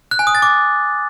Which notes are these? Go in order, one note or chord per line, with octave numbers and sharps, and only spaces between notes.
F#6
G#5
D#6
A6
D6